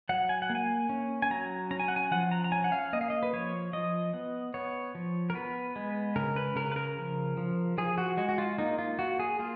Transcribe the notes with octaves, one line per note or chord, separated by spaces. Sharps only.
F#3 F#5
G#5
F#5
A#3
G#5
C#4
G#5
F#3 A#5
C#4 A#5
G#5
F#5
G#5
F3 F#5
A#5
A#5
C#4 G#5
F#5
F5
A#3 D#5
F5
D#5
B4
F3 C#5
F3 D#5
B3
B3 C#5
F3
A#4
B3 B4
G#3
C#3 A#4
B4
C#3 A#4
B4
A#4
F3
F3
F3 G#4
F#4
G#3 F#4
F#4
F4
A#3 D#4
F4
A#3 F#4
G#4
A#3 F4